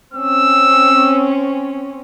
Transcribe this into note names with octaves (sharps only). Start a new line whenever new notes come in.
C4 C#4 E6